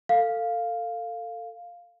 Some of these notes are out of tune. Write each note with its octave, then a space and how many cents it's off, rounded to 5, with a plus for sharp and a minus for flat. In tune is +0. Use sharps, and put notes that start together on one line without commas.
A4 +25 F5 +0